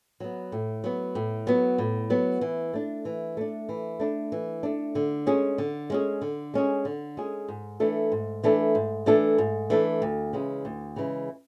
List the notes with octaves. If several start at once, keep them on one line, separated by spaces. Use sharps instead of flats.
F#3 B3
A2
F#3 B3
A2
F#3 B3
A2
F#3 B3
E3
A3 D4
E3
A3 D4
E3
A3 D4
E3
A3 D4
D3
G#3 C#4 G#4
D3
G#3 C#4 G#4
D3
G#3 C#4 G#4
D3
G#3 C#4 G#4
G#2
E3 A3 D4 A4
G#2
E3 A3 D4 A4
G#2
E3 A3 D4 A4
G#2
E3 A3 D4 A4
D2
C#3 E3 G#3
D2
C#3 E3 G#3